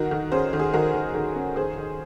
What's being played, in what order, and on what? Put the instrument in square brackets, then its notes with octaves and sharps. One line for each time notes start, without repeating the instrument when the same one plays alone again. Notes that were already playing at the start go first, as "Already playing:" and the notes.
Already playing: [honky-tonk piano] D#3 F#4 A#4
D#3
C#4 G#4 C5
D#3
G#4
D#3 F#4 A#4
D#3
D#3
C#4
D#3 G#4 C5
D#3